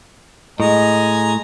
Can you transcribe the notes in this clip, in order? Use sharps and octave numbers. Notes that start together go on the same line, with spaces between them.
A2 G#3 D#5 G#5 A#5